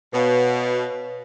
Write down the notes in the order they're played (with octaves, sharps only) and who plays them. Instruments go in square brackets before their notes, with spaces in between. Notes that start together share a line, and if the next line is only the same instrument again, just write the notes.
[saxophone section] B2 [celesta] B4 C#5 F5